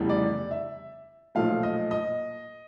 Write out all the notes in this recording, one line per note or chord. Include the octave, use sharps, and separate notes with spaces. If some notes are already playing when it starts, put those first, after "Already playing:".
Already playing: F1 E2 C#3 E3 G3
D5
E5
B1 A#2 F3 A3 F5
D#5
D#5